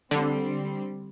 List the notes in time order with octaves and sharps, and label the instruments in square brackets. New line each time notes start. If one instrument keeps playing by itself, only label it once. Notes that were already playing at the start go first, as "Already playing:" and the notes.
[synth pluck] D3 [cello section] G3 C4